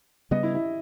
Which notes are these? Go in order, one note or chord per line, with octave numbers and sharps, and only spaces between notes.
C#3 G3 B3 D#5
E4
E4